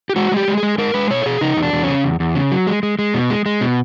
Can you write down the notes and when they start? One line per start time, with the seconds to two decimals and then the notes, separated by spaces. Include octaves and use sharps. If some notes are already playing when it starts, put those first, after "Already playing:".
0.10 G4
0.16 G#3 F#4
0.32 G#3
0.37 G4
0.48 G#3
0.58 G#4
0.63 G#3
0.78 G#3 A#4
0.94 G#3 B4
1.10 B2 C#5
1.22 A4
1.26 B2 G#4
1.41 C#3 D#4
1.57 E2
1.63 D4
1.73 E2
1.84 C#4
1.89 C#3
2.04 E2
2.20 E2
2.35 C#3
2.52 F#3
2.67 G#3
2.83 G#3
2.99 G#3
3.14 B2
3.30 G#3
3.46 G#3
3.61 B2